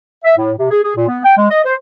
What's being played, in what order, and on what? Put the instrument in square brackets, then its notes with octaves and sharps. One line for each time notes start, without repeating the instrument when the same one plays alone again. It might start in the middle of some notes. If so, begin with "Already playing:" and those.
[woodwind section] E5
A2
C3
G#4
G#4
A#2
B3
G5
G#3
D#5
C5